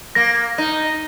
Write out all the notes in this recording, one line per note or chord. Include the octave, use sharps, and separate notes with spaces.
A#3 A#6
D#4